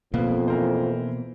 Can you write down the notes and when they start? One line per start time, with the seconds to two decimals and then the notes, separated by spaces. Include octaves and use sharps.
0.14 F2 B2 A#3 B3 B4 F5
0.48 E3 A#4 C5